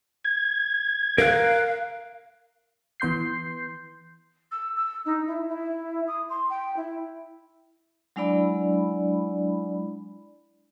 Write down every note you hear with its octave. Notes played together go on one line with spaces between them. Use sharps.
G#6
A#4 F5 F#6
E3 B3 C6 G6 C7
E6
E6
D#4
E4
E4
D#6
C6
G5
E4
F#3 G#3 D4 E4 D5 B5